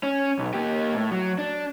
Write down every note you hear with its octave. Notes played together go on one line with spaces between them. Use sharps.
C#4
B1
A#3 G4
A2
F#3
D4